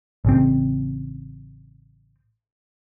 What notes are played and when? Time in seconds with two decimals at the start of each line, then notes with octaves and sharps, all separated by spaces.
0.25 A1 C#3 C4